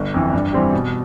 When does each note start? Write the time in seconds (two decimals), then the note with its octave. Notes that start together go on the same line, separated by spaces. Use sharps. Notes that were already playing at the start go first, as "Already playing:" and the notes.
Already playing: G1
0.14 F2 E3
0.33 G2
0.53 E3 G3 C4 G4
0.73 B2